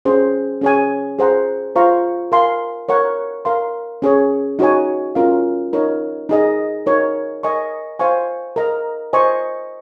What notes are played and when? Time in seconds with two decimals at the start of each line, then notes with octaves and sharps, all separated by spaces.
0.05 C#4 G#4 C5
0.61 C#4 G#4 C#5 G#5
1.19 G#4 C5 F#5 A#5
1.76 F4 C5 F5 A#5 C#6
2.32 A#4 F5 G#5 C6
2.89 A#4 C#5 F#5 C#6
3.45 A#4 F5 C6
4.02 C#4 G#4 C#5
4.59 D#4 F#4 C#5 G#5
5.15 C#4 F4 A#4 F5
5.73 D#4 A#4 C#5
6.29 D#4 G#4 D#5
6.86 D#4 A#4 C#5
7.43 A#4 D#5 G#5 C#6
7.99 C5 F5 G#5 C#6
8.56 A#4 D#5 A#5
9.13 C5 D#5 G#5 C#6